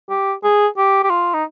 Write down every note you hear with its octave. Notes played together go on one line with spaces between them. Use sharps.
G4
G#4
G4
G4
F4
D#4